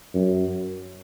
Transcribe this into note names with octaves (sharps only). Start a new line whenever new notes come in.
F#2